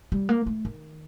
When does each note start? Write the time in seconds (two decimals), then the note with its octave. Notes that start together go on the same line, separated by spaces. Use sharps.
0.12 G3
0.29 A#3
0.47 A3
0.65 D#3